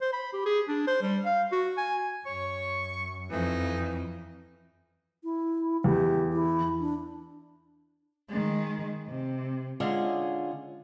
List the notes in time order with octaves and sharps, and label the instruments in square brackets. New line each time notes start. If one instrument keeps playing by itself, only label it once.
[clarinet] C5
B5
G4
G#4
D4
C5
G3
F5
F#4
G#5
[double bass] F#2 [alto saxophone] C#5 [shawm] C#6
[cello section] F2 [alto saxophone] E3 [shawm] D#4
[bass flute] E4
[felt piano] E2 [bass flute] G4
[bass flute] E4
D4
[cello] D#3 G#3
C3
[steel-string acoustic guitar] D3 G#3 C#4 F4 G#4